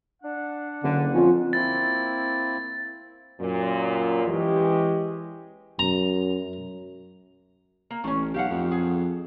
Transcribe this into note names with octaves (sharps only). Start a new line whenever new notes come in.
D4 F#5
F#1 D3
F2 C#4 F4
A#3 C4 E4 A6
F#2 A#2
E3 G#3 C#4 G4
F#2 A#5
A#3
A1 A3 C#4
B1 G4 F5 F#5
F2
G#4